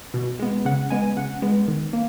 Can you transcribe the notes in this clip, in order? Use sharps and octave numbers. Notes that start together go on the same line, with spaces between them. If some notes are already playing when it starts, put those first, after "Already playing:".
B2
G#3 B3
C#3 F#5
G#3 B3 G#5
C#3 F#5
G#3 B3
D#3
A#3